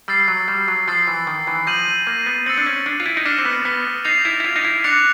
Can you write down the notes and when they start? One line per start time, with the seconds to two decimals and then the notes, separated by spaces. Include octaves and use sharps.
0.08 G3 E6 A6 C7
0.28 F#3
0.48 G3
0.68 F#3
0.88 F3 E6 A6 C7
1.08 E3
1.27 D#3
1.47 E3
1.67 F3 G6 A#6 D#7 F#7
2.07 A#3
2.26 B3
2.46 C4 E6 A6 C#7 F#7
2.58 D4
2.66 C#4
2.86 D4
3.00 F4
3.06 E4
3.17 D#4
3.25 D4 D6 F6 A#6 C#7 E7
3.38 C4
3.45 B3
3.65 B3
4.05 D#4 A6 C7 F7
4.25 E4
4.40 E4
4.44 F4
4.56 D#4
4.65 E4
4.84 D4 D6 F#6 A#6 C#7 F7